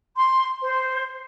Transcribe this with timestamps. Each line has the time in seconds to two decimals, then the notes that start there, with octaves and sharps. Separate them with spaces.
0.16 C6
0.61 C5